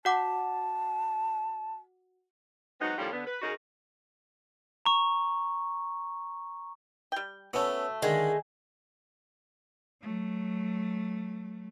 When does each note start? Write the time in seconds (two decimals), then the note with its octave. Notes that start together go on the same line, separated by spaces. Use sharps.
0.05 F#4 F#5 A5 D6
2.80 F#3 G#3 B3 C4 D#4 F#4
2.97 A2 D#3 F3 G3 C#4 F4
3.12 D3 B3
3.25 B4
3.42 C#3 C#4 D#4 F#4 G#4 A#4
4.86 A#5 C#6
7.12 G3 G5
7.53 A3 B3 C#4 F#4 A5 E6
8.02 D3 D#3 G#3 G#5
10.01 F#3 A3